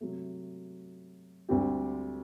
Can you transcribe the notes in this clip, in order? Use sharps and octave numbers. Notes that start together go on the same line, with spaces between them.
C3 F#3 A3
D2 D3 G3 C4 G4